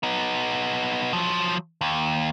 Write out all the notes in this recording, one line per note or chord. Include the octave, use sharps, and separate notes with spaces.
B3 D#4
F3 F#3
D#2